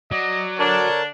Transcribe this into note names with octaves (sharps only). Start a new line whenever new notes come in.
F#3 D5 D#5
D3 D4 A#4 C#5 A5